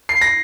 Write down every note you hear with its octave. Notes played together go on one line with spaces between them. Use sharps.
C7
A#6